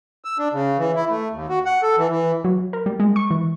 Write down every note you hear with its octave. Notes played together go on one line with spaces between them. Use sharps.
E6
D4
C#3
E3
E4
A3
D#2
F#4
F#5
A4
E3
E3
F#3
A#4
G3
G#3
C#6
E3